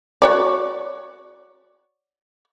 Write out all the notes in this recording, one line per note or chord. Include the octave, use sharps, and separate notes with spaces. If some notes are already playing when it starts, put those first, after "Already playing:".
F#4 C#5 D5